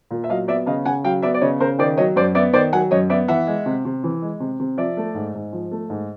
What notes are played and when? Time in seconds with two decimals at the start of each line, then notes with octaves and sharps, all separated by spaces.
0.11 A#2
0.24 E5
0.29 F#3 D#5 F5
0.48 B3 D5 E5
0.66 C#3 D#5 F5
0.85 C#3 F#5 G#5
1.04 F#3 F5 G5
1.22 B3 D5 E5
1.34 D5
1.41 C#3 C#5 D#5
1.60 C#3 A#4 C5
1.79 D#3 C5 D5
1.97 F#3 C#5 D#5
2.16 F#2 C5 D5
2.35 B3 D5 E5
2.53 D#3 C5 D5
2.73 F#3 F#5 G#5
2.91 F#2 C#5 D#5
3.10 B3 D5 E5
3.28 E3 E5 F#5
3.47 G#3
3.66 C3
3.85 C3
4.03 E3
4.22 G#3
4.40 C3
4.60 C3
4.78 F3 D5 E5
4.97 A3
5.15 G#2
5.34 G#2
5.53 F3
5.71 A3
5.90 G#2